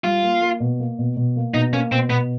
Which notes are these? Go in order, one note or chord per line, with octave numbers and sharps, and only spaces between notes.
G3 F4
A#3
A#3
B2
A#3
B2
B2
A#3
B2 D#4
A#3 C#4
B2 C4
B2 B3